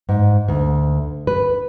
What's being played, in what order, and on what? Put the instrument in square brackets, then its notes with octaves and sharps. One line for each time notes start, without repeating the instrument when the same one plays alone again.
[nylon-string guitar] G#2
D2
B4